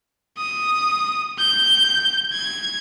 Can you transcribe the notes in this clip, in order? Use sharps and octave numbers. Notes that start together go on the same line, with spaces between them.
D#6
G6
G#6